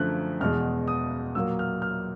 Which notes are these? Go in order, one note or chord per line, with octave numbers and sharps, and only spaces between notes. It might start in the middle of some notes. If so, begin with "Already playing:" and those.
Already playing: F#2 D3 F3 A3 F#6
E2 B2 G#3 F6
D#6
A#2 F#3 A#3 E6
F6
F6